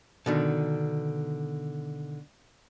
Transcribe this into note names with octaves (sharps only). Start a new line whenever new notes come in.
B2 D3 D#3